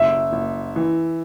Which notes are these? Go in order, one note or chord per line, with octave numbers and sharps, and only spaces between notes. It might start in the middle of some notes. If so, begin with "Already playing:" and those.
Already playing: F#1 E5
F#1
E3